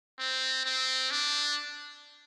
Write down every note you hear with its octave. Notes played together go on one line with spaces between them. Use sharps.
C4
C4
D4